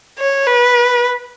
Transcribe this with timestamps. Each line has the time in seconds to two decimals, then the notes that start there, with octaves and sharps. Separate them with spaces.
0.19 C#5
0.47 B4